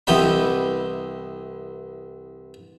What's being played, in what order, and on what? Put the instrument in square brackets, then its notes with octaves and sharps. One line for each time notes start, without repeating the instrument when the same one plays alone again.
[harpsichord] C2 E3 B3 G4 D#5 B5